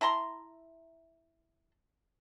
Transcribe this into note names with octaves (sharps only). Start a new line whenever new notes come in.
E4 A5 A#5 C6